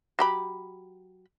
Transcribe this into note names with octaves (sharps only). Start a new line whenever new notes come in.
F#3 G4 B5